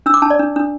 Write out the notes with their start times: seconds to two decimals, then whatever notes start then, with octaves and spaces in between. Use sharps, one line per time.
0.06 D4 E6
0.14 D6
0.22 D4 A5
0.30 D5
0.39 D4
0.56 D4